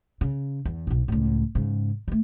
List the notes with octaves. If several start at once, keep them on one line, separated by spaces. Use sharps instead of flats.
C#3
E2
B1 B2
C#2 A2
G#2 C#3
G3 A3